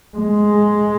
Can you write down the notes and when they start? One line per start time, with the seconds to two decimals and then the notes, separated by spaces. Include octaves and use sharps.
0.18 G#3